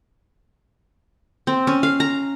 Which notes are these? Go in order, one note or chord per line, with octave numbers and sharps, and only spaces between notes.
C4
C#4
F5
A#5